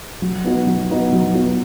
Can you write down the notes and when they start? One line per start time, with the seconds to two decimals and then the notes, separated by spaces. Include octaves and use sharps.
0.22 F#3
0.44 B3 D#4 F#4
0.67 F#3
0.90 B3 D#4 F#4
1.13 F#3
1.35 B3 D#4 F#4